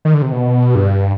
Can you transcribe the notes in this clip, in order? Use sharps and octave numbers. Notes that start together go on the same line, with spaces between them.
D#3
D3
C3
B2
G2